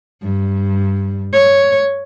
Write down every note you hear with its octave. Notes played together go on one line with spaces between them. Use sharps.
G2
C#5